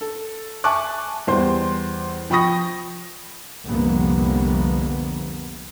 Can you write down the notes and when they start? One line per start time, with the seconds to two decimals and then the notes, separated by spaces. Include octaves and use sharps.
0.01 A4
0.64 E5 G#5 A5 C#6 D6 F#6
1.27 E2 G3 C5 C6
2.30 F3 G5 B5 C#6 D#6 A#6
3.66 C2 F2 D3 A#3 B3